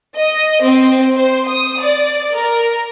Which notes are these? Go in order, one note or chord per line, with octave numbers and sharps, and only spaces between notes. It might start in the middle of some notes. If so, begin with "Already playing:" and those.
D#5
C4
C5
D#6
D5
A#4